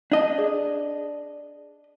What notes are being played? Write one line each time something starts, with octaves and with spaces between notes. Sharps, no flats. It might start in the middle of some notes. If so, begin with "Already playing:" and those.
D4 D#5
G#4 D5